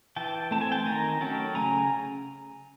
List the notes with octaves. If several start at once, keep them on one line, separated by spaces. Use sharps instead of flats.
E3 G5 A5
A3 C4 A5
G#5
G5 A5
D#3 G#5 A#5
F#3 A3 C#4 G5 A5
C#3 G#5 A#5